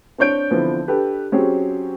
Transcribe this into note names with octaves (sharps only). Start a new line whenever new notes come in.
C4 D4 C#5 G6 D7
D3 E3 F3 B3 C4
D4 G4 A4 B4
F#3 C4 C#4 G4 G#4